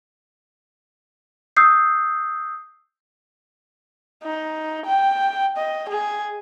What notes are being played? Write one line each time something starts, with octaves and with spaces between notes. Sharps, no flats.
D#6 E6 G6 C7
D#4
G5
D#5
G#4